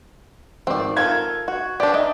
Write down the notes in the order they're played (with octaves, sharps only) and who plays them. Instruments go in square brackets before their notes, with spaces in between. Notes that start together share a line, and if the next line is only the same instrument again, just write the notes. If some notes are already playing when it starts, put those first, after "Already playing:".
[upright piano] G#1 [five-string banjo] C4 D5
[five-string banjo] F4 A4 A#4 [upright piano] G#6
[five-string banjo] F#4
[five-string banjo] D4 G4 [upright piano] D5
[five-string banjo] D#4 [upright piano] E5